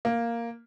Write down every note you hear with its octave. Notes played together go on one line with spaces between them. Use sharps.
A#3